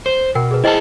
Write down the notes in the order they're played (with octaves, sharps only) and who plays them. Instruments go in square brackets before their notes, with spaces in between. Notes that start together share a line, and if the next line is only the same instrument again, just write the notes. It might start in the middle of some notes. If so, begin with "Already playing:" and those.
[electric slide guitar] C5
[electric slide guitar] B2 [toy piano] A#4 F#5 G5
[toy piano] G#4 B4
[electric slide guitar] E4 G#4 A5 [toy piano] C5 D#5 G5